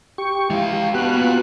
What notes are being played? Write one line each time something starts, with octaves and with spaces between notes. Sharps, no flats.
G4 C#6
E3 G#3 F5
G4
B3 F#4 G4 B4 F#6
A#3 F4